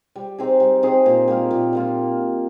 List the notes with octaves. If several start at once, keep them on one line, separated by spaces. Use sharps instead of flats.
G3
C4 D#4 G#4
G3
C4 D#4 G#4
A#2
G3 A#3 F4
A#2
G3 A#3 F4